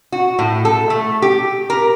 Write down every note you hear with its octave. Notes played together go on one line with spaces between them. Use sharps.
F#4
A2
A4
A3
G4
A#4